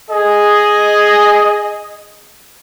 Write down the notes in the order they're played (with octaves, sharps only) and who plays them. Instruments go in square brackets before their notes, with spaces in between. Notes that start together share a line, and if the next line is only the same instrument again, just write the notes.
[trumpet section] G#4 D#5